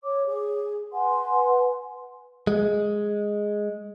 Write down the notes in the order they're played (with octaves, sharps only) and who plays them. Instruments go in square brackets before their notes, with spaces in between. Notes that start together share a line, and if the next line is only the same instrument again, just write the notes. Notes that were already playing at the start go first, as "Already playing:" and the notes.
[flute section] C#5 D6
G#4
B4 F#5 G#5 C6
[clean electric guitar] G#3